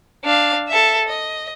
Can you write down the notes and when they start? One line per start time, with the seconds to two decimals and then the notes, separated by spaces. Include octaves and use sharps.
0.24 D4 F5
0.68 A4 E5
1.08 D#5